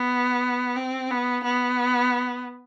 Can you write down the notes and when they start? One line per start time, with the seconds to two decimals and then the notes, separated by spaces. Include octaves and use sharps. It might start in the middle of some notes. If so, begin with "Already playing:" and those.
Already playing: B3
0.76 C4
1.11 B3
1.44 B3